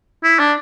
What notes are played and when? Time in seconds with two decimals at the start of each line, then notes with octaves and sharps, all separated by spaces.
0.24 E4
0.39 D4